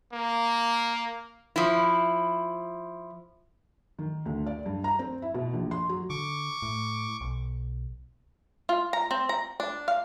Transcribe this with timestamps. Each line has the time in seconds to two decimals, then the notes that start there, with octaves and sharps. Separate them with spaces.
0.13 A#3
1.56 F3 E4
3.99 D#3
4.26 D2
4.46 D5
4.66 G2
4.84 A#5
4.99 C4
5.22 E4
5.34 B2
5.54 A#1
5.71 C6
5.89 F#3
6.10 D3 C#6 D6
6.62 A2
7.21 B1
8.69 F4
8.93 A#5
9.11 C4
9.29 A#5
9.60 D4
9.88 F5